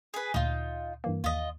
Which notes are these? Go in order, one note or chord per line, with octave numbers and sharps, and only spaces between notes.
G#4 B4
D2 A#2 D#4 F4
G2 E3 A#3
D#2 F4 D#5